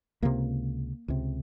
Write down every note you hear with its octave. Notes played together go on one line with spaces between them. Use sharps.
C#2 C3 A#3
C#2 C3